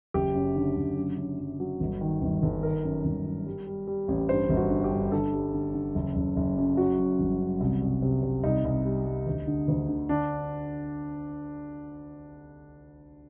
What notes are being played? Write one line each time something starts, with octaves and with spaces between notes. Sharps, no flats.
F#1 G4
F#2
D3
F#1
F#2
F#2
F#2
F#3
G1
D#3
G1
G1
D#3 A#4
F#2
G1
F#2
G3
G3
G3
A1
G2 C5
G1
F#4
D3
G4
G2
D3 A4
G3
D3
D3
F#1
F#1
F#1
F#2
F#3 F#4
F#2
G1
F#2
C2
C2
C3
C3
C2 D#4
C2
G3
G3
D2
D3
D2
D3
D3 D4